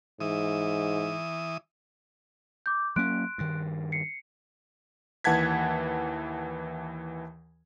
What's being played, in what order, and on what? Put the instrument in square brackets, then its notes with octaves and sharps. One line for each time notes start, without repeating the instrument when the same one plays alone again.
[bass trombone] G#2 [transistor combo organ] E3 D#6
[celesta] D6 G6
[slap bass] F#3 A#3 C#4 [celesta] C6 F#6 D7
[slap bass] G2 D#3
[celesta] C7 C#7
[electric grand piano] D#2 E3 F#5 A5 G#6 B6